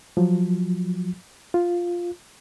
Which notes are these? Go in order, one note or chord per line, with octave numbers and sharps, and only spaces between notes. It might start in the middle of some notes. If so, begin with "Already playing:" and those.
F3 F#3
F4